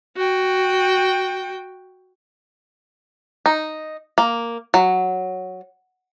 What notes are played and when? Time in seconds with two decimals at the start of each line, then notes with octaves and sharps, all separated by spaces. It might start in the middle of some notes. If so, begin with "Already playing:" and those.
0.17 F#4 G5
3.46 D#4
4.18 A#3
4.74 F#3